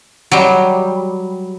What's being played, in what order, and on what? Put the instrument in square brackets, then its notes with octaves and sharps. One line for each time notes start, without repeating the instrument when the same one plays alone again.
[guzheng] F#3 G3